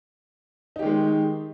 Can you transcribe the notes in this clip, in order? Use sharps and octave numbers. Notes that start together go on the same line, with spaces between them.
D#3 G#3 D#4 G4